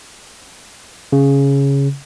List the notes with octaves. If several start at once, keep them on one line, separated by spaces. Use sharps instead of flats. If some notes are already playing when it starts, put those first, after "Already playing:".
C#3